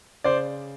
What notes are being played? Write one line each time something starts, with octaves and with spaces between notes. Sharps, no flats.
C#3 C5 D5